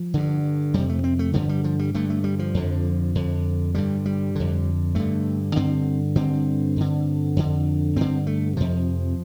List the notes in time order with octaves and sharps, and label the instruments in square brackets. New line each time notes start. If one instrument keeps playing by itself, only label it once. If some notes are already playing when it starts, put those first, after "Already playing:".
Already playing: [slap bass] F3
G2 D3
F2 C3 G3
A3
C4
A3
G2 D3 F3
G3
F3
G3
G2 D3 A3
A3
G3
F3
F2 D3
F2 D3
G2 D3 G3
G3
F2 D3
G2 D3 A3
G2 D3 C4
G2 D3 C4
G2 D3
F2 D3
G2 D3 C4
A3
F2 C3 F3